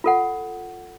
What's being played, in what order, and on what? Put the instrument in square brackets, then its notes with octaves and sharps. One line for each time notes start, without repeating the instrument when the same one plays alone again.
[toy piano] F4 A4 F#5